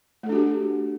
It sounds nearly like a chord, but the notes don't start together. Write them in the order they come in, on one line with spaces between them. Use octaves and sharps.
A3 A4 D4 F#4 G4